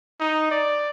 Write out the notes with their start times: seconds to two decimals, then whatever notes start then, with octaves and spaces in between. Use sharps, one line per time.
0.20 D#4
0.51 D5